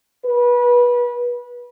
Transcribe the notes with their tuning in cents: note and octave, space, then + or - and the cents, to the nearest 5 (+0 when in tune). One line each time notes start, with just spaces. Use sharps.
B4 -25